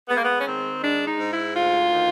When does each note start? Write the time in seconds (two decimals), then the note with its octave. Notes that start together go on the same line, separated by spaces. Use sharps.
0.09 G#3 B3
0.17 A#3
0.24 B3
0.40 C#4
0.45 D#3 C4
0.82 G#3 D4
1.06 D#4
1.18 G#2
1.31 E4
1.55 D2 F4
1.92 D#3